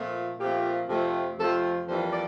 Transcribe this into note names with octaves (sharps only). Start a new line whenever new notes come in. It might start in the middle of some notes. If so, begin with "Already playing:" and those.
Already playing: A#2 F3 A3 C4
A#2 F3 A3 C4 G4
F2 C3 F3 A3
F2 C3 F3 A3 A4
F2 E3 G3 A#3 C5
D5